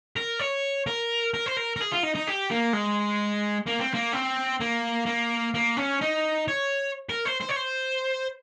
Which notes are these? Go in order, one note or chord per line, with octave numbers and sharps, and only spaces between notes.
A#4
C#5
A#4
A#4
C5
A#4
A#4
G#4
F4
D#4
D#4
G4
A#3
G#3
A#3
C4
A#3
C4
A#3
A#3
A#3
C#4
D#4
C#5
A#4
C5
C5
C#5
C5